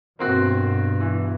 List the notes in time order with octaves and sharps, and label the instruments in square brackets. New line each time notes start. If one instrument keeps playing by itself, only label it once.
[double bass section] G2 B2 [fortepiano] A#3 C4 F#4
[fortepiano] E3